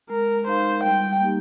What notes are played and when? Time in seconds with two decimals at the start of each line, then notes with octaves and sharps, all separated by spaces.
0.10 G#3 A#4
0.47 D#4 A#4 C5 F5
0.83 G3 G5
1.20 A#3 D#4 G4